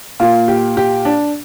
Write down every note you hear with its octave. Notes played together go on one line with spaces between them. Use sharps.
A#2 A#3 F4
G4
G4
D4